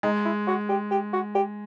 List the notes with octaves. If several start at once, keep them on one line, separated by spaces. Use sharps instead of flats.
G#3 D#4
E4
F#4
G4
G4
F#4
G4